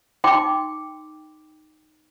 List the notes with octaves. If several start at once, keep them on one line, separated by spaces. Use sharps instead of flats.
D#4 G5 C6 D6